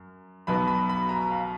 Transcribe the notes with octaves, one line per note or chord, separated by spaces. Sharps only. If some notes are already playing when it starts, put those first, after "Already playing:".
Already playing: F#2
B1 B2 F#3 B3 B5
B5
B5
A#5
F5